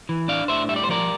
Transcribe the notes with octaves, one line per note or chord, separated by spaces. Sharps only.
E3
D4 D5 F5
A2 C5 E5
G3 E5
D5
C5
F3 A#4 D5